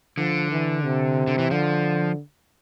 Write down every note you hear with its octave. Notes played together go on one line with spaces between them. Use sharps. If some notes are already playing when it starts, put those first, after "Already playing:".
D3 F3
E3
C3
D3
E3
D3 F3